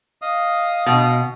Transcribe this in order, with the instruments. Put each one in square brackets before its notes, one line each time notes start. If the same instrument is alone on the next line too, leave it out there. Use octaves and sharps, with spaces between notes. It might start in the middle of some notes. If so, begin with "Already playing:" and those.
[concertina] D#5 F5 D#6
[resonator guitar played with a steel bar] B2